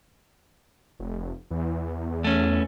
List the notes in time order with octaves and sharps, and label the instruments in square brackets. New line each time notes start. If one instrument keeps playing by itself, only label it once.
[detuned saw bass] F1
E2
[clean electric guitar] A3 C#4